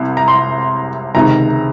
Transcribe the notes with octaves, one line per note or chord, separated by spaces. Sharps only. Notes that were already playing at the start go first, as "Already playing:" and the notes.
Already playing: C2 C3
A#5
C6
C#2 C3 D#3 A#5